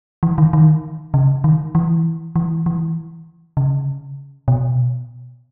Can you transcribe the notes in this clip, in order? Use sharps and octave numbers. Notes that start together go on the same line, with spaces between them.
E3
D#3
D#3
C#3
D#3
E3
E3
E3
C#3
B2